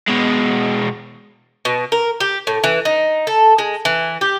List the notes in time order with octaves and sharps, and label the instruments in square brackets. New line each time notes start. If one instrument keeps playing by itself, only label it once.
[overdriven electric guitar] B2 G#3
[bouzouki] B2
A#4
G4
A2
E3
D#4
A4
G#3
E3
G4